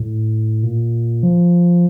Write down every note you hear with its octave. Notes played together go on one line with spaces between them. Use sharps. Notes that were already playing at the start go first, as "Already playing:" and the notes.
Already playing: A2
A#2
F3